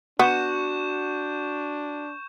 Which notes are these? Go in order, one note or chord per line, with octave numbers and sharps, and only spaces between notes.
B3 D4 F#4 C#6 G6 E7